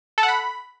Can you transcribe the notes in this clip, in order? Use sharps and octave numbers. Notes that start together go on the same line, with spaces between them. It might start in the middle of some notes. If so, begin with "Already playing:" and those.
A4
F#5
B5